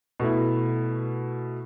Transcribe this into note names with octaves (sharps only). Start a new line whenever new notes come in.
B2 A3 E4